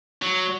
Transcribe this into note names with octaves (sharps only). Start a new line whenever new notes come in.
F#3